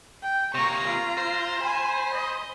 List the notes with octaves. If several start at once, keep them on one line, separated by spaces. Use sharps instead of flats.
G5
C3 A#3 A#5 C#6
F4
C5
G#5 B5
D#5